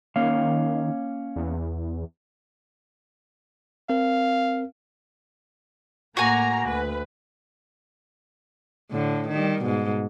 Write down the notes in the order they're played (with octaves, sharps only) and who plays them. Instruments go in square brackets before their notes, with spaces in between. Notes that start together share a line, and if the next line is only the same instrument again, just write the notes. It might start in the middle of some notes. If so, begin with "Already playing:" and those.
[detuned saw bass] D#3 [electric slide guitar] A#3 C#4 F5
[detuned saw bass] E2
[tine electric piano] C4 A#4 [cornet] F5
[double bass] A2 [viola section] A#3 A#5 [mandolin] F#4 G#5
[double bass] D2 [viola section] B4
[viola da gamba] A2 D3
D#3 G3
G#2 B2